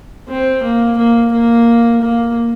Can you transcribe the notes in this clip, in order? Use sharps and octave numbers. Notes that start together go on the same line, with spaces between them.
C4
A#3
A#3
A#3
A#3